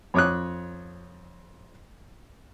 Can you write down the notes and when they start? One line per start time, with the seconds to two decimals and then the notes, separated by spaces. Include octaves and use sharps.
0.14 F2 C#5 D6 D#6 F#6